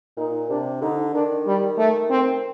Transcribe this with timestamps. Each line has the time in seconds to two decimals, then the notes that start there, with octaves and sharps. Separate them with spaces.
0.17 A#2 D#4
0.50 C3 D4
0.82 D3 D#4
1.13 D#3 D4
1.46 G3
1.78 A3
2.10 C4